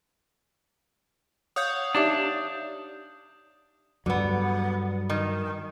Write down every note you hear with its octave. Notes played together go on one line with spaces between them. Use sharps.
C#5 F5 F#5 D#6 G6
D4 D#4 G4 E5
G2 D3 F#3 B3
D#3